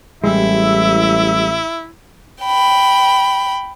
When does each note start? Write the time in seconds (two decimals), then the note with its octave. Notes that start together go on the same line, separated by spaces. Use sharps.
0.24 A1 G3 G#3 E4 E5
2.43 G5 B5